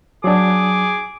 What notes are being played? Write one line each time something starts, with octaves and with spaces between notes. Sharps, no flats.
F#3 D4 G#4 D6